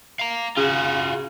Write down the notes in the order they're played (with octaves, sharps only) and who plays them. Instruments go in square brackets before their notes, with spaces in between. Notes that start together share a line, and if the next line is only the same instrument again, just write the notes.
[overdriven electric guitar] F5 A#5
[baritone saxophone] C#3 [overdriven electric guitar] F4 F#4